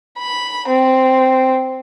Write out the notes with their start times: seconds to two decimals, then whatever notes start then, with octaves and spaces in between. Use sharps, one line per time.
0.19 B5
0.68 C4